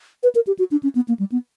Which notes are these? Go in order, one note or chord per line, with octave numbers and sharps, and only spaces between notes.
B4
A#4
G4
F#4
D4
C#4
B3
A#3
G3
B3